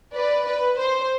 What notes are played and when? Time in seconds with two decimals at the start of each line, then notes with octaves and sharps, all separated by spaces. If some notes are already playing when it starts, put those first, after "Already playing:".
0.15 B4 D5
0.47 B4
0.79 C5